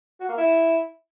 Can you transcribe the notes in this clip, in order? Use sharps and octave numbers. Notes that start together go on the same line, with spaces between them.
F#4
A#3
E4